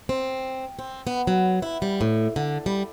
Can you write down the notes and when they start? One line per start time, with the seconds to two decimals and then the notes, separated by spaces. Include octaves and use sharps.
0.09 C4
0.79 C4
1.07 B3
1.27 F#3
1.62 E4
1.82 G3
2.01 A2
2.36 D3
2.66 G3